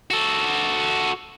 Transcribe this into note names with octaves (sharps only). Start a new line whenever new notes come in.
F#4 A4